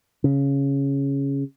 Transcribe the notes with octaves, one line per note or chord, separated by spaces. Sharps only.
C#3